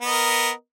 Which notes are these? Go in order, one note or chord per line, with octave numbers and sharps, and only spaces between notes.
B3 A#4 D#5